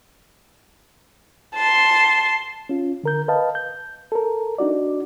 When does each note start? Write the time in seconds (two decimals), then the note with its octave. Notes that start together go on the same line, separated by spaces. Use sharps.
1.55 A5 C6
2.69 C#4 F4
3.04 D3 A#4 G6
3.28 B4 D#5 F5 A5
3.55 G6
4.12 A4 A#4
4.58 D4 D#4 F#4 D5